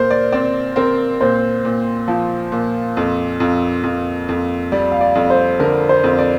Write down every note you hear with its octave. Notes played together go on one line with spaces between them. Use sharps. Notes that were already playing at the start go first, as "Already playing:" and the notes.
Already playing: A#2 A#4 C5
D5
C4 D5
C4 A#4
A#2 C5
A#2
F3
A#2
F2
F2
F2
F2
G3 D5
F5
D5
F2
C5
D3 A#4
C5
F2
D5